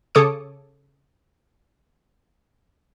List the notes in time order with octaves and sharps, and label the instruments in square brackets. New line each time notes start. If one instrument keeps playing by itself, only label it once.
[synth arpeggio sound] C#3 A4 C#5 D6 D#6 C#7